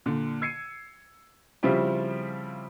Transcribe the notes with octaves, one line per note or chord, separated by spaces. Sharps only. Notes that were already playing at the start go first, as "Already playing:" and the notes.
A#2 D3
E6 G#6 C7 C#7 D#7
C#3 F3 G3 C4 E4 G4